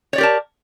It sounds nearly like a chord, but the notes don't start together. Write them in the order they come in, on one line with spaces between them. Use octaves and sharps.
C#5 D5 G4 A#4 A5